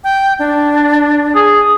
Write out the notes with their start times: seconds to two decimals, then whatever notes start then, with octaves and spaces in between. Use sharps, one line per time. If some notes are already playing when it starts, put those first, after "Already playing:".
0.04 G5
0.39 D4
1.35 G#4